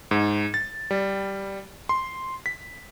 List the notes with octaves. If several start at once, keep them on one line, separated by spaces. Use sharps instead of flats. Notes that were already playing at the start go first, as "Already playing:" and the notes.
G#2
A6
G3
C6
B6